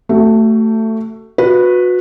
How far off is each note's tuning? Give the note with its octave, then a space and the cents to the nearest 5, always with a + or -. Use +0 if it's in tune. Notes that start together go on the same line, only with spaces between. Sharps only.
A3 +15 F#4 +30
F#4 -30 B4 +0